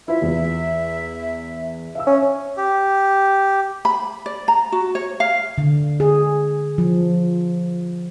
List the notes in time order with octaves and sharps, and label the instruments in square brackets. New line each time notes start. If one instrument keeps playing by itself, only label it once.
[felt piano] E4 F4 C5 [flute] E5
[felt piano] E2
E5 F5 E6
[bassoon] C#4
[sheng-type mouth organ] G4
[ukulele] B5
D5
A#5
F#4
C#5
F5
[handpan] D3
G#4
F3